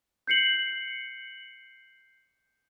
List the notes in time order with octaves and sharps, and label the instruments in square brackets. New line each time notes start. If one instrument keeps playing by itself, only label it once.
[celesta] G6 C7 C#7 F#7